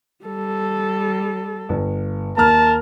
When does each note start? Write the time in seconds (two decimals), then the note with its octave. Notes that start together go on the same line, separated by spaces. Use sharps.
0.25 G3 A4
1.69 G1
2.38 D#2 A#4 A5 A#5 F6